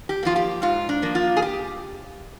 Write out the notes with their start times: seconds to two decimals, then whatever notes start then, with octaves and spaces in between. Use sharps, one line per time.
0.09 G4
0.23 F3 A#3 F4
0.36 G4
0.62 G#2 F4
0.89 D4
1.02 F3 A#3
1.15 F4
1.37 G#4
1.42 G4